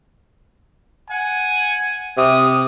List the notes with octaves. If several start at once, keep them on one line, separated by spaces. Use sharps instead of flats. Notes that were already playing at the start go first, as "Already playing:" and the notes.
F#5 G#5
C3 D#6